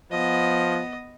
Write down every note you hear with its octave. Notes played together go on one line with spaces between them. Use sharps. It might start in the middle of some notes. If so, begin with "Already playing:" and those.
F3 B3 D#5